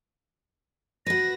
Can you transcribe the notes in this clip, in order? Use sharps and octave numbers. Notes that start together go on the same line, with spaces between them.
F#4 B4 A#6